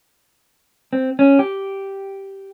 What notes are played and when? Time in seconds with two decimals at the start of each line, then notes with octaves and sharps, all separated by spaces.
0.93 C4
1.19 C#4
1.39 G4